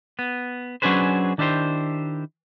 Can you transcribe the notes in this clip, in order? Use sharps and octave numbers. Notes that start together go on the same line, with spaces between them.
B3
F#3 C#4 D4 G#4 B4 C5
D#3 D4 E4 G4 C5